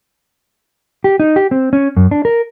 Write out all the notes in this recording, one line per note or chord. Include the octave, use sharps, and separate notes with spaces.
G4
D#4
G4
C4
C#4
F#2
D4
A#4